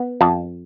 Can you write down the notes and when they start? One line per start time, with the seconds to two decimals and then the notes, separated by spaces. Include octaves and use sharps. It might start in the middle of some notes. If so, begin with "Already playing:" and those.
Already playing: B3
0.21 F2 A5